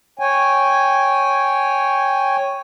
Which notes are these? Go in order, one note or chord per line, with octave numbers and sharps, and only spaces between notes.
C#5 G5 G#5